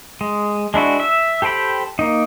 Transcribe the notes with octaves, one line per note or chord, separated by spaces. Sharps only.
G#3
G#3 D4 E4 F#4
E5
G4 A4 C5 G5 B5
A#3 D#4